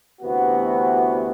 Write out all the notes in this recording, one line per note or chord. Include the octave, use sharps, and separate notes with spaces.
D2 C3 E3 B3 F#4